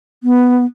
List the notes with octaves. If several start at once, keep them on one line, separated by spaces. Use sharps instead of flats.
B3